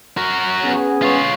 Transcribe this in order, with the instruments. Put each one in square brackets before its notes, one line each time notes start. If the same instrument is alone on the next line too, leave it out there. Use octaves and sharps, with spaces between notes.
[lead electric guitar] F#4 A#4
[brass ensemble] B3 G#4 [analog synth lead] C#4
[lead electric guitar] F4 C#5